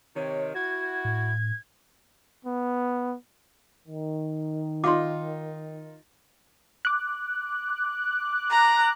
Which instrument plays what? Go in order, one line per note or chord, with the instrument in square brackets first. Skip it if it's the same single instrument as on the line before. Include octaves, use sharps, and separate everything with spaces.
[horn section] C3 D#3 [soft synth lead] C#5
[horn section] E4 F#4 [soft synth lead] G#6
[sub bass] A2
[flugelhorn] B3
[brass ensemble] D#3
[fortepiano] D#4 F4 [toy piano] C6 D6
[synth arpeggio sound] D6 F#6
[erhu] A#5